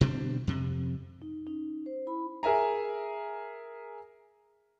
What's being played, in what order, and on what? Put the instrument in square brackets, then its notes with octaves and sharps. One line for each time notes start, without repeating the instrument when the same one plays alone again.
[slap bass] B2 D3 G3 C4
F2 C3
[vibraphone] D#4
C#4 D#4
C5
E4 B5
[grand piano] G#4 A#4 E5 G#5 A#5